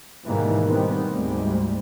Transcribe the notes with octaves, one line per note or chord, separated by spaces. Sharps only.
G#2 B2 D#3 E3 G3 A#3
D#3 G3 B3 C4
D2 G#2 G3 G#3